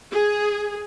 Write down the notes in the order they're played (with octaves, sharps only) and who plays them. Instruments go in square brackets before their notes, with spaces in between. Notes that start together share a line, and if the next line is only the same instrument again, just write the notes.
[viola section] G#4